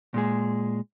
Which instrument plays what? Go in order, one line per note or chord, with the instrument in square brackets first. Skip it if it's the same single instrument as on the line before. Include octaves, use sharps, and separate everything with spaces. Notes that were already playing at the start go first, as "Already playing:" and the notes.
[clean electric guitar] A#2 G#3 G#4